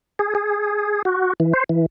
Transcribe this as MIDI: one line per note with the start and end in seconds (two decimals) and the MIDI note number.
0.19 0.35 68
0.35 1.02 68
1.05 1.33 66
1.40 1.53 52
1.53 1.64 72
1.69 1.86 52